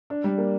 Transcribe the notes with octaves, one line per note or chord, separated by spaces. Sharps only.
D4
G3
A#3